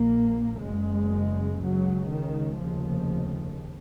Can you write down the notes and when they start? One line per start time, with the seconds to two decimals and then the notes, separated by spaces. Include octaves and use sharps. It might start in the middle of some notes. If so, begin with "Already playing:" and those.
Already playing: A#1 A#2 A#3
0.62 F#1 F#2 C#3 G#3
1.63 C#2 C#3 F#3
2.12 D#3
2.62 F1 D#2 C#3 F3